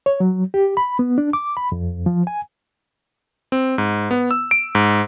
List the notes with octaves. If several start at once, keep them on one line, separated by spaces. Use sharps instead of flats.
C#5
F#3
G4
B5
B3
D4
D6
B5
F2
F3
G#5
C4
G#2
B3
E6
D7
G#2